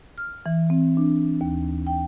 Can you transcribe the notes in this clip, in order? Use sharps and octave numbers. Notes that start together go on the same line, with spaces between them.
F6
E3
C4
D4
D#2
G5